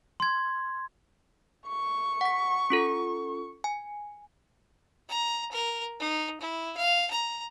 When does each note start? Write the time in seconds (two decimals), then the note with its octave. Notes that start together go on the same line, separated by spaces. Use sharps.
0.20 C6 G#6
1.68 C#6
2.21 F#5 B6
2.70 C#4 F4 A4
3.64 G#5
5.09 A#5
5.52 A#4
6.00 D#4
6.41 E4
6.77 F5
7.11 A#5